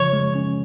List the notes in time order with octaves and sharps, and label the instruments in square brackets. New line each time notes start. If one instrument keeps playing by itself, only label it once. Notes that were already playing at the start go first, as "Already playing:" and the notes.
Already playing: [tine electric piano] C#3 F3 [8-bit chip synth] C#5
[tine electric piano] G#3
C#4